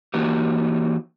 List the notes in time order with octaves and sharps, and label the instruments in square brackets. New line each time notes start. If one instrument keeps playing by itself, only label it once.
[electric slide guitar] E3 A#3 D#4 F#4 G4